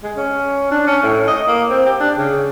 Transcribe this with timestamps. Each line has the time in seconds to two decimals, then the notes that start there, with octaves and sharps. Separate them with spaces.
0.03 G#3
0.17 C#4
0.71 D4
0.87 C#4
1.03 A2
1.28 D#5
1.48 A#3
1.70 C4
1.86 G4
2.00 D4
2.18 C#3